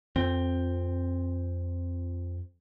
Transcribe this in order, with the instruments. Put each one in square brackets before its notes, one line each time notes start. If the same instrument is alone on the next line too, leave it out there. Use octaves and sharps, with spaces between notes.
[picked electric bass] F2 C4